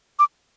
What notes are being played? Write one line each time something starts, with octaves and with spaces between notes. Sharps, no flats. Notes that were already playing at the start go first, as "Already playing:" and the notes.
D6